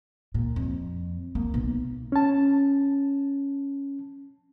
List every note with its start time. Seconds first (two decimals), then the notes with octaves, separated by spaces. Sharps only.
0.34 A#2
0.56 F2
1.35 A#3
1.54 B1
2.12 C#4 A5